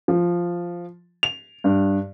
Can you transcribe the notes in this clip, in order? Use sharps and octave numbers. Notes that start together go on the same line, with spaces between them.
F3
F7
G2